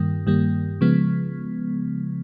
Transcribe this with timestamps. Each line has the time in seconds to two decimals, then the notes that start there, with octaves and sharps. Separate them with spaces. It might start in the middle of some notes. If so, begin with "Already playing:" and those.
Already playing: G2 D#3 G3 A#3
0.26 G2 D#3 G3 A#3
0.81 C#3 F3 G#3 B3